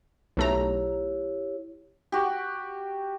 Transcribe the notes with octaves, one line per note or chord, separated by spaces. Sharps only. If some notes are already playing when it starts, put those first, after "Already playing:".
B1 A3 E4 G4 C#5 A#5
F#4 G4